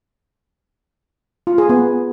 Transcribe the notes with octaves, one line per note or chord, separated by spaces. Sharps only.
F4
G#4
B3